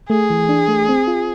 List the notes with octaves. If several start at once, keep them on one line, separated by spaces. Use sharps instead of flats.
A3 G#4
E3
D4
A3
C4
F4